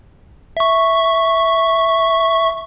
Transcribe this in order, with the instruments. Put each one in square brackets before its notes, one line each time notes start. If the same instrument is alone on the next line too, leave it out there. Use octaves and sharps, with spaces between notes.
[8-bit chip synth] E5 C#6